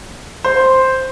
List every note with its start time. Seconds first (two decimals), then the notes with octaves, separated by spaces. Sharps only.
0.44 C5